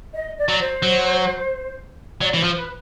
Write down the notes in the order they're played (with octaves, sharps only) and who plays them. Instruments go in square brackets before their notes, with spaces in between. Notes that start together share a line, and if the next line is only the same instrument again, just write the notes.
[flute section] D#5
D5
[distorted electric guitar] F#3
[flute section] C5
[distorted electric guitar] F#3
[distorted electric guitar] F#3 [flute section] D5
[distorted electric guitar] E3 [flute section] C#5
[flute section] C5
[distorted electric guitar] F3
[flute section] B4